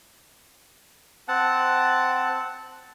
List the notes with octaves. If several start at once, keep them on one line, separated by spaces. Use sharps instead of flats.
C4 F#5 A5